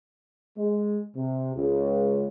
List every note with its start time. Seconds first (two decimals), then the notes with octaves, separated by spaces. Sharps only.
0.57 G#3
1.15 C3
1.55 C#2